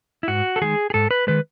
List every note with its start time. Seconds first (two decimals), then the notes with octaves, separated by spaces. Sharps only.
0.23 E4
0.28 G#2 F#4
0.56 A4
0.61 D#3 G#3 G#4
0.90 G#4
0.94 G#2 A4
1.11 B4
1.27 D#3 G#3 B4